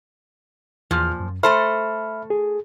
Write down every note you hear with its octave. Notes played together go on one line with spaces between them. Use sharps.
E2 A#2 F3 F6
F#2
A3 A4 C5 E5 B5 F6
G#4